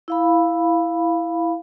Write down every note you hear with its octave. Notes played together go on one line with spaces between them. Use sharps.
E4 F5 B5